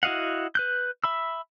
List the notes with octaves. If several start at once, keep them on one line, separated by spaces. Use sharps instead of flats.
E4 F#4 D#5 F5 F#5
B4 F#6 G6
E5 B5 E6